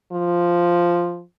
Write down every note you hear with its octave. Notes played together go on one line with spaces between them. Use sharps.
F3